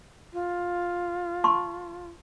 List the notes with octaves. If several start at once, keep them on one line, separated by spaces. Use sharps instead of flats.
F4
A5 C6 C#6